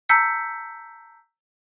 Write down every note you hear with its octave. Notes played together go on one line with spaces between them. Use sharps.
A5 A#5 E6 G6 B6 C#7